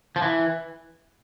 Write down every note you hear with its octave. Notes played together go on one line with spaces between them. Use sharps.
F3
E3